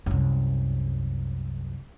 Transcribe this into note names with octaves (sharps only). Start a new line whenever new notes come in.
C2 F#2